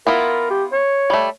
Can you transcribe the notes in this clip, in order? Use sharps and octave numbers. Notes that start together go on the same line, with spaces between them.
B3 E4 F4 A#4
G4
C#5
G3 A3